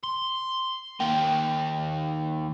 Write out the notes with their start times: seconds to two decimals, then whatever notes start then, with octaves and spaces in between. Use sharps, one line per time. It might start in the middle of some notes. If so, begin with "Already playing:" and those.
0.04 C6
1.00 D#3 A#3 G5